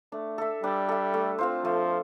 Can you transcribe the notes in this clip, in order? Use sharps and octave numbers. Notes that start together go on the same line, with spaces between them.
A3 D4
A4 E5
G3 D4
A4 E5
A3
C4 F4 C5
F3 A3